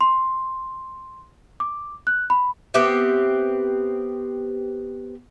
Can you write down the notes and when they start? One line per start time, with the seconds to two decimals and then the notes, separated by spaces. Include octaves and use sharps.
0.01 C6
1.60 D6
2.07 F#6
2.30 B5
2.74 B3 C4 G4 E5